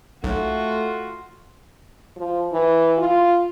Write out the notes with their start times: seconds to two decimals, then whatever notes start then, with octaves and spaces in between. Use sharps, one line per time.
0.24 B1 A3 F4 F#4
2.17 F3
2.53 E3
2.98 F4